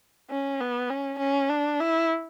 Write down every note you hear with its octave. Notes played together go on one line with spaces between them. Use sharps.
C#4
B3
C#4
C#4
D4
E4